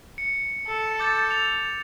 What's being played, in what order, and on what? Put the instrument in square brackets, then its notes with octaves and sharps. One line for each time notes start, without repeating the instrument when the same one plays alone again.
[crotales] C#7
[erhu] A4
[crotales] D6 G6 A6
A6 F7